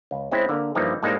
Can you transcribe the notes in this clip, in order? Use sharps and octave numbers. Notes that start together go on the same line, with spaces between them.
C#2
G#3 C4 C#4 E4 C5
D3 A#3
G2 E3 F3 G3 A#3 D#4
A2 G3 G#3 A#3 D#4 C5